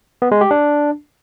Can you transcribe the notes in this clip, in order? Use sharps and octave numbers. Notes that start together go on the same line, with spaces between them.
B3
G#3
G4
D4